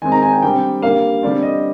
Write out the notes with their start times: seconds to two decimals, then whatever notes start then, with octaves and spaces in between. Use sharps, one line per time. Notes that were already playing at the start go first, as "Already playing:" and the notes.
0.02 D#3 G#3 C4 G#5
0.12 A#5
0.23 G#5
0.32 G5
0.42 D3 G3 C4 G5
0.82 D3 G3 A#3 F5
1.23 D3 G3 C4 D5
1.43 D#5